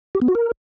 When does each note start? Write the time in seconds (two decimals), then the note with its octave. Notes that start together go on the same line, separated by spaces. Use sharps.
0.15 G4
0.22 B3
0.28 F#4
0.35 A#4